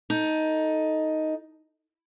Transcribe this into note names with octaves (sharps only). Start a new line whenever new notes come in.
D#4 A4